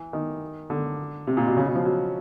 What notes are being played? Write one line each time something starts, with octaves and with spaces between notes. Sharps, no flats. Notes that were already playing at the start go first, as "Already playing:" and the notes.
Already playing: E3
D#3
D3
C3
A#2
B2
C#3
B2
F3
F#3